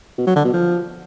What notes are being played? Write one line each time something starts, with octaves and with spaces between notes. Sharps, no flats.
B2
F#3
D3
B2
F3